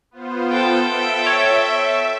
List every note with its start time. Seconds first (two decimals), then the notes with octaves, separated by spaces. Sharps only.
0.11 B3 F4 C5
0.51 A4 G5
0.81 E5
1.26 C#5